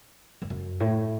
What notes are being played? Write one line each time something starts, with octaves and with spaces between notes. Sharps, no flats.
E2
F#2
A2